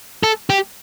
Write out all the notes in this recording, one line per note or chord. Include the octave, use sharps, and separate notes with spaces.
A4
G4